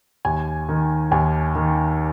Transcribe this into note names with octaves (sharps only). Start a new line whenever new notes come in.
D#2 G#5
D#3
D#2 G#5
D#3